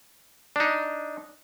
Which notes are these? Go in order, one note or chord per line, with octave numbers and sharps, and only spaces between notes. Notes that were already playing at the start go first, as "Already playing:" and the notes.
D4 D#4